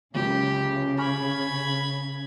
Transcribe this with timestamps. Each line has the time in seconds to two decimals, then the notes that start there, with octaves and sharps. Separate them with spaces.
0.14 F#1 C#2 F#2 C#3 G4
0.98 G#5 B5 C#6 F6 G#6